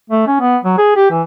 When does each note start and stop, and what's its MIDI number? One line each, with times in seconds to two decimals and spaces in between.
0.10 0.24 57
0.27 0.36 61
0.40 0.57 59
0.64 0.77 54
0.78 0.93 68
0.96 1.09 67
1.10 1.22 52